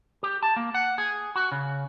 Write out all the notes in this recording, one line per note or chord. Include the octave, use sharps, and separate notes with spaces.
G4
A5
A#3
F#5
G#4
F#4
C#3